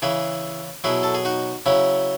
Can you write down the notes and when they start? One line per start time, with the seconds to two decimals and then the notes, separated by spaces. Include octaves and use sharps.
0.02 C#3 E3 E4 G#4
0.84 B2 F#3 E4 G#4
1.03 A4
1.15 G#4
1.25 D#4 F#4
1.66 C#3 F#3 C#4 E4